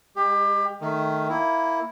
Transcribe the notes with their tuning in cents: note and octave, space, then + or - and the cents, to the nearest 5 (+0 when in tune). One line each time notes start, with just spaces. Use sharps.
G#3 -25 G4 +25
D#3 -5 A3 +0
A#3 +0 E4 +0